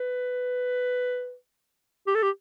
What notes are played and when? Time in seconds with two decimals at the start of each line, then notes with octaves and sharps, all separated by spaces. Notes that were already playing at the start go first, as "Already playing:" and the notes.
Already playing: B4
2.07 G4
2.15 A4
2.23 G4